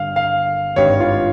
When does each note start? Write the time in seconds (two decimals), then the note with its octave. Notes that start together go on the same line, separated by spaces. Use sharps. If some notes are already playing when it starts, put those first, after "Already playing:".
Already playing: G1 G2 F5
0.16 F5
0.76 G#1 G2 G3 C#5
1.00 F4